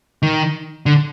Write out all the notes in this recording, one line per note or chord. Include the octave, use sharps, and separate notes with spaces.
D#3
D3